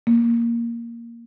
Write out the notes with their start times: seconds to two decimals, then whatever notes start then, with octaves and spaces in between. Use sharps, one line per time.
0.07 A#3